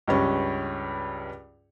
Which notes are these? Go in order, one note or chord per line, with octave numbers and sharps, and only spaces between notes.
C#2 G2 C#4